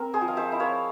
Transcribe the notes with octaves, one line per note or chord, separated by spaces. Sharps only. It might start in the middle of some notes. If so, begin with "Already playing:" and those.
Already playing: C4 A#4
G#4 C5
F3
F5
C5 E5
E4
C#5 F5